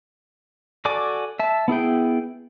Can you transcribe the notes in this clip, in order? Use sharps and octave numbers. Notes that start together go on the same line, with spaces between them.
F#4 A4 D5 G#5 D6
E5 A5
B3 E4 G#4 G5